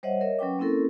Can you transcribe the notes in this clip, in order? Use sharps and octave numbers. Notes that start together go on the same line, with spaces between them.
G3 C5 C#5 D#5 E5 F#5
A#4 C#5 D#5 E5
F#3 C#4 B4 G5 D6
A#3 C4 C#4 E4 A4 A#4